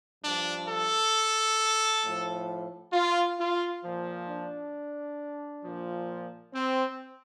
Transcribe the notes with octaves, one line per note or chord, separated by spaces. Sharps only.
G2 F3 D4
A4
A2 F3
F4
F4
A#2 F3
D4
A#2 F3
C4